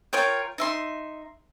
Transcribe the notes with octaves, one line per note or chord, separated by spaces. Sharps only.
F4 A#4 C#5 G5
D#4 E5 C6